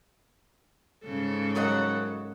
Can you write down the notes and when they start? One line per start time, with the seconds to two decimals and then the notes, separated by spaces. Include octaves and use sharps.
1.04 G#2 C#3 A4
1.55 F#2 F#3 C#5 D#5 F#5